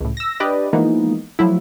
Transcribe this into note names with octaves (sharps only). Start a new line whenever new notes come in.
C#2 A2
E6 A#6
D4 G4 B4 D5 D#5
E3 F3 G#3 A#3 B3 D#4
F3 F#3 A3 E4